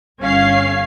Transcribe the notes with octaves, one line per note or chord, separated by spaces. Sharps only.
G1 C#4 F5 G#6 C7